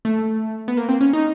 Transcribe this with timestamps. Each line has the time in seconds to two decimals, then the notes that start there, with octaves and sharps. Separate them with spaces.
0.05 A3
0.68 B3
0.77 A#3
0.89 C4
1.01 C#4
1.13 D#4